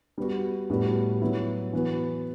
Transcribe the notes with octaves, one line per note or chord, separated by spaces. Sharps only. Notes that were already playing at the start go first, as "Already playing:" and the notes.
G3 B3 F#4
A2 G3 B3 F#4
F#3 B3 E4
E3 B3 F#4